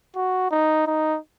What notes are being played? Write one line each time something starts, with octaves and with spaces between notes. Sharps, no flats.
F#4
D#4
D#4